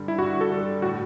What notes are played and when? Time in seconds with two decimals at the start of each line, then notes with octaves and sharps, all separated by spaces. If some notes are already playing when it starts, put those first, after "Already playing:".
Already playing: G2 D3 G3
0.08 E4
0.19 G2 F#4
0.41 A4
0.51 D3 G3
0.82 A2 F#4